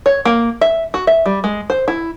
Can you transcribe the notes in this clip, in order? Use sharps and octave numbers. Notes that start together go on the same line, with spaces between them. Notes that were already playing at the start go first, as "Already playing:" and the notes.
C#5
A#3
E5
F#4
E5
G3
G#3
C5
E4